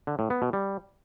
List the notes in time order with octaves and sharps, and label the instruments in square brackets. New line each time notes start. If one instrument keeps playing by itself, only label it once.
[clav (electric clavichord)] D3
A2
B3
B2
G3